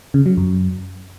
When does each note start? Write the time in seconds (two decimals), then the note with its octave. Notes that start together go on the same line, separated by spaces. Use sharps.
0.14 C#3
0.26 F#3
0.37 F#2